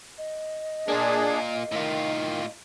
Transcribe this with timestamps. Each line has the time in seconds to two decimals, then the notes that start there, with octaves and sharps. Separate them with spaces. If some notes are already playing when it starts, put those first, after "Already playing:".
0.18 D#5
0.88 A#3 D4 F4 G#4
1.72 A2 D#3 F4